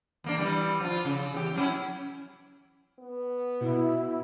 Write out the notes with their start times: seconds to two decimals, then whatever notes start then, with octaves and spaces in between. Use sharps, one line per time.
0.24 E2 A#3 D4
0.38 E3 G3
0.81 F3 F4
1.05 C#3
1.34 E2 G4
1.56 F#3 C#4 E4
2.99 B3
3.61 B2 E4